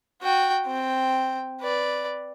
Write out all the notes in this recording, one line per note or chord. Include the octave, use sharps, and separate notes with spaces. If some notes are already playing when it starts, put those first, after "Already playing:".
F#4 G5
C4 G5
B4 D5